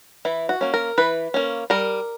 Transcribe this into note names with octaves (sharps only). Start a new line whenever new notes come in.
E3 E4
F#4
A#3 C#4
A#4
E3 B4
A#3 C#4
G3 A#4